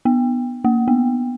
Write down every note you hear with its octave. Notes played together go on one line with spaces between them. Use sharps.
B3
A#3
B3